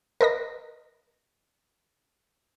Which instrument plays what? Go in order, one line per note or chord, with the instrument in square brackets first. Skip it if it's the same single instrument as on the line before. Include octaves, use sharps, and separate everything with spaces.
[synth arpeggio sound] A#4 B4 D#5 A#6